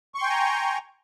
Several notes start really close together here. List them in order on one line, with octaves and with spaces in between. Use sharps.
C#6 C6 G5 G#5 A#5